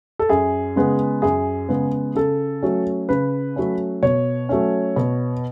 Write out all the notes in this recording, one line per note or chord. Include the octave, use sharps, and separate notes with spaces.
A4
F#2 G#4
C#3 G#3 B3
F#2 G#4
C#3 G#3 B3
C#3 A4
F#3 A3 C#4
C#3 B4
F#3 A3 C#4
B2 C#5
F#3 A3 C#4
B2